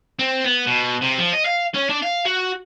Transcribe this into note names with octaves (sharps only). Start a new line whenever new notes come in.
C4
B3
B2
C3
F3
D#5
F5
C#4
D4
F5
F#4